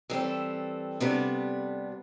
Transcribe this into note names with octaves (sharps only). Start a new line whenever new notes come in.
E3 G3 C4 A4
C3 G3 B3 D4